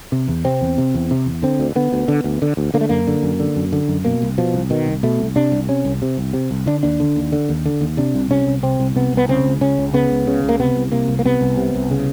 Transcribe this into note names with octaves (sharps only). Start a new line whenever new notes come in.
C3
E2
C3 C4
E2
C3
E2
C3
E2
D3 C4
D2
D3 B3
D2
D3
D2
D3
D2
D3 A#3
A3
F#2 A#3
D3
F#2
D3
F#2
D3
F#2
B2 A#3
C2
B2 F3
C2
B2 D#3
C2
B2 A3
C2
C3 D4
C2
C3 C#4
C2
C3
C2
C3
C2
D3 D4
D#2 D4
D3
D#2
D3
D#2
D3
D#2
C3 D4
C2
C3 C#4
C2
C3 C4
C2
C3 B3
C2 B3
C#3 C4
C#2
C#3 C#4
C#2
C#3 B3
C#2
C#3
C#2
A#3
C3 B3
C2
C3 A#3
C2
A#3
C3 B3
C2
C3
C2
C#3